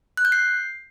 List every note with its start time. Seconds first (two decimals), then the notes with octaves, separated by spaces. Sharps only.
0.17 F#6
0.25 G6
0.32 C7